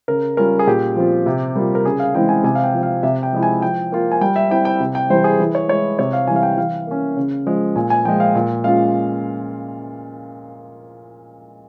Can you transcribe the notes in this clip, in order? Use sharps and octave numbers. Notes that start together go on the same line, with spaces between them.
C#3 A#4
G3 C#4 F4 A#4
G#4
A#2 G4
F3 C4 F4
C3
G3 A#3 F4
A#4
C#3 G#4
F5
E3 G#3 C4 E4 G5
G#5
C3 G#5
F5
G5
F3 C4
F5
C3 E5
G5
F3 G#3 E4
G#5
F3 G5
A#3 F4
G#5
G3 G5
E5
C4 E4 G5
G5
C3
G5
E3 G3 C5
G#4
E3
C#5
G#3 E4 C#5
C3 C#5
F5
E3 G3 G#5
F5
G5
E3 F5
A#3 C#4
C#3
F3 G#3
A#2 G#5
G#5
F3 G#3 G5
F5
A#2
G#3 C#4 F4 F5